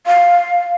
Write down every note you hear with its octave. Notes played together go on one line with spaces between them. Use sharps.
F5